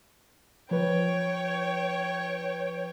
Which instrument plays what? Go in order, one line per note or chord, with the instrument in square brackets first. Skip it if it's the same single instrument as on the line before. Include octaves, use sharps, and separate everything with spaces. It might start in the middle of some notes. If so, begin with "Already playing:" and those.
[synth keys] F3 B4 [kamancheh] C#5 G5